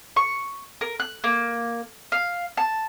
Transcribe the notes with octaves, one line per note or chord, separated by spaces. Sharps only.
C#6
A#4
F#6
A#3
F5
A5